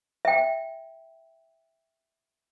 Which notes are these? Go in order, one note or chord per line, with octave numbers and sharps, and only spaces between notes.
E5 G5